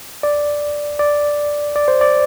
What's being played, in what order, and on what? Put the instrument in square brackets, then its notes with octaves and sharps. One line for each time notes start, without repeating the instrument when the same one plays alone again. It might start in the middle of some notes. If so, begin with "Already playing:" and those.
[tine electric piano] D5
D5
D5
C5
D5